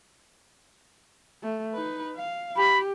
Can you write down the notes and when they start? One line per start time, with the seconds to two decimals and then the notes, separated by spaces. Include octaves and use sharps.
1.43 A3
1.74 D#4 B4
2.16 F5
2.56 G4 B5